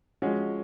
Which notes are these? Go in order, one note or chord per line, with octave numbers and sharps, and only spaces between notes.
F3 G#3 C#4 F#4